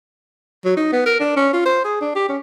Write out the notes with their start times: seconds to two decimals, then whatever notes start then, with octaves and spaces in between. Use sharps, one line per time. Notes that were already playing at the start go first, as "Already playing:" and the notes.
0.65 F#3
0.77 D#4
0.93 B3
1.06 A#4
1.20 D4
1.36 C#4
1.53 F4
1.66 C5
1.84 G#4
2.01 D4
2.15 G4
2.29 C#4